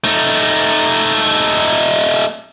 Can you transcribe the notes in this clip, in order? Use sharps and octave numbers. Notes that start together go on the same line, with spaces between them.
A3 D#4